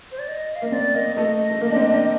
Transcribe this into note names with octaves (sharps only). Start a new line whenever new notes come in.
C5
D5
D#5
F5
A#3 D#5
C4 D5
A#3 D#5
A3 D#5
A3
A#3
D4
C4
D4